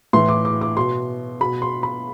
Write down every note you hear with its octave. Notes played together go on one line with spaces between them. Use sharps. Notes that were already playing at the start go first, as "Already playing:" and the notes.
A2 E3 C6
D6
D6
D6
B2 C6
B2 B5
C6
B5